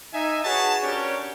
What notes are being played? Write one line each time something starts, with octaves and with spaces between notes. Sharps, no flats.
D#4 E5 G#5
F#4 G#4 B4 C#5 A5
C#4 D4 F#4 G4 A#4 C#5